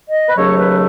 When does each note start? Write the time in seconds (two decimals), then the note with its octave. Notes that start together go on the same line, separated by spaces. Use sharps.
0.09 D#5
0.29 B4
0.37 D#2 C#3 F#3 A3 C#5
0.58 B4